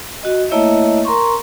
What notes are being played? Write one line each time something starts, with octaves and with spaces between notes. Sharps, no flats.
F#4 D#5
A3 A#3 E4 C#5 D#5 E5
A#4 A#5 C6 C#6